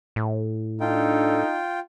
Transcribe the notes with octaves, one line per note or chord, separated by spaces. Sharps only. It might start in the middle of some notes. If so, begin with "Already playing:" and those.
A2
D4 D#4 F4 A4 G5